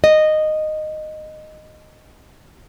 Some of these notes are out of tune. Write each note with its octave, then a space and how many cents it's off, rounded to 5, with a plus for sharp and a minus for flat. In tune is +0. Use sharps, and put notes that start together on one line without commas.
D#5 -10